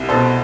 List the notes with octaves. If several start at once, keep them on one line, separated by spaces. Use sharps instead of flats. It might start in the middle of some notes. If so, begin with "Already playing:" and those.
Already playing: C2
B2 A4 C5